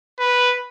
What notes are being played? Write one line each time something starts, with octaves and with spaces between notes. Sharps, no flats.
B4